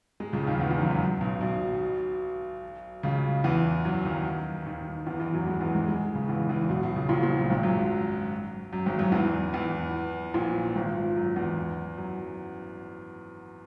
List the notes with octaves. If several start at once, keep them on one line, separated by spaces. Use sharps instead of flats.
G#2 G#3
C#2 C#3
D#2 D#3
E2
E2
F#2
F#2
B1 B2
B1 B2
C#2 C#3
E2 E3
F#2 F#3
D#2 D#3
D#2 D#3
E2 E3
E2 E3
F#2 F#3
G#2 G#3
E2 E3
G#2 G#3
G#2 G#3
C#2 C#3
E2 E3
E2 E3
B1 B2
B1 B2
C#2 C#3
A#1 A#2
A#1 A#2
B1 B2
G#1 G#2
F#2
F#2
G#1 G#2
F#2 F#3
E2 E3
E2 E3
A#1 A#2
G#1 G#2
F#2
E2
F#2